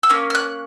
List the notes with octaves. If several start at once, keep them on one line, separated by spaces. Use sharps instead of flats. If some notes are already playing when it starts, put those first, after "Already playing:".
E6
A#3 C#4
F6
F#6